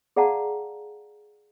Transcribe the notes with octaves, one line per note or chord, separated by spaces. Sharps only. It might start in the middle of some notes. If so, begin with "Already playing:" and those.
G#4 D5 F5 F#5 A5 A#5